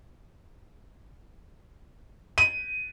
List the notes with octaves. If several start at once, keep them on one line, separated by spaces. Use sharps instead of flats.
D#7